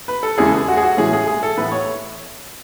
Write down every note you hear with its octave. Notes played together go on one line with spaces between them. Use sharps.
B4
A4
E2 C#3 E3 G#3 G#4
A4
G#4
F#4
G#4
F#4
A2 E3 G#3 C#4 G#4
G#4
G#4
A4
A2 E3 B3 E4 B4
C#5